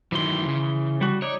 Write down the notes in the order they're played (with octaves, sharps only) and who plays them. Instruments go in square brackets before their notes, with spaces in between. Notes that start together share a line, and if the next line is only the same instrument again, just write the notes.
[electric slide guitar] D#3 F#3 [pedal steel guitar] E3 C6
[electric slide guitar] C#3
[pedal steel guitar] G3 F#4
[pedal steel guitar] D#4 D5 [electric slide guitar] C#5